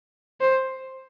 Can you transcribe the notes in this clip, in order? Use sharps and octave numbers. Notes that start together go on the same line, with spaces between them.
C5